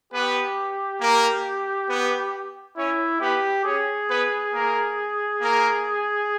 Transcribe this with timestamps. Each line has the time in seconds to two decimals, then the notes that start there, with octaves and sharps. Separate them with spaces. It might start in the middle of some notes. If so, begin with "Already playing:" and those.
0.13 B3 G4 B4
1.01 A#3 A#4
1.89 B3 B4
2.77 C#4 E4 C#5
3.21 B3 G4 B4
3.65 C#4 G#4 C#5
4.09 B3 B4
4.53 A#3 A#4
5.41 A#3 A#4